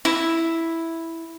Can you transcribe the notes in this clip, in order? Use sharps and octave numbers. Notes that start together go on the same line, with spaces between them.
E4